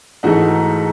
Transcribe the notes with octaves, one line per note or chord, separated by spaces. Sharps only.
G#2 E3 A3 D#4 F#4